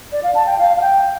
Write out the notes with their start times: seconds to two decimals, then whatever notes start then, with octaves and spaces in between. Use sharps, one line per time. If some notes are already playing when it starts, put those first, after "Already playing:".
0.12 D5
0.23 F5
0.35 A5
0.46 G5
0.58 F5
0.77 F5
0.82 G5